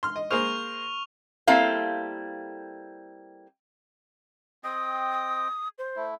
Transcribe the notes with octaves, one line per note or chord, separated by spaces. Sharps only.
C6 F6
D#5
A#3 G#4 C5 C#6 F6 F7
G3 A#3 C4 E4 A4 F5
C4 D#5 G5 D#6
C5
A3 E4